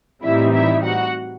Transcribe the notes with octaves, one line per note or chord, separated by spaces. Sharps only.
A2 E3 G3 C4 D#4 E4 E5
E4 E5
F#4 F#5